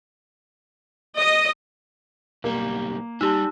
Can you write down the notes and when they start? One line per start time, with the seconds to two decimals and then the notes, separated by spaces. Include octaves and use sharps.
1.21 D#5
2.44 B1 G3 A#3
3.21 G3 D#4 G4 A5 E6